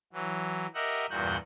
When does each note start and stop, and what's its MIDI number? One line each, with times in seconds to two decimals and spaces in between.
0.13 0.67 52
0.13 0.67 54
0.75 1.06 67
0.75 1.06 70
0.75 1.06 75
0.75 1.06 76
0.75 1.06 78
1.10 1.37 40
1.10 1.37 43
1.10 1.37 46
1.10 1.37 66
1.10 1.37 90
1.10 1.37 91